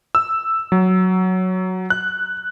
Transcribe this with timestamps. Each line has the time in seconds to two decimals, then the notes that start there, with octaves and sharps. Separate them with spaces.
0.15 E6
0.72 F#3
1.90 F#6